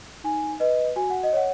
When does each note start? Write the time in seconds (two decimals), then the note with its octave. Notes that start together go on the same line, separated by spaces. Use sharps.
0.24 D#4 G#5
0.60 B4 D#5
0.96 F#4 G#5
1.10 F#5
1.23 D#5
1.33 C#5 F#5